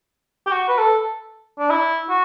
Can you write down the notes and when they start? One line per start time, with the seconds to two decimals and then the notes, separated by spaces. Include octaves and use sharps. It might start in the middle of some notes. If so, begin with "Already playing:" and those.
0.47 G4
0.52 F#4
0.68 B4
0.79 A4
1.59 D4
1.70 E4
2.09 F#4